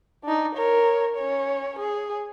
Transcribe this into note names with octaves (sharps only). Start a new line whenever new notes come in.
D4 D#4
A#4 C#5
C#4 C#5
G#4